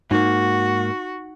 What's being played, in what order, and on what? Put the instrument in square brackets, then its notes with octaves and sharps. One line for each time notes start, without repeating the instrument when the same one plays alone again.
[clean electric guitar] G#2 A#3 [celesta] D#4 [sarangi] F#4